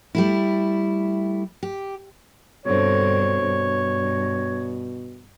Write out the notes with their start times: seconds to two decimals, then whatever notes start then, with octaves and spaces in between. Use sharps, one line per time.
0.15 G3 A3 E4
1.63 G4
2.66 G2 B2 D3 C4 C#5
3.42 G2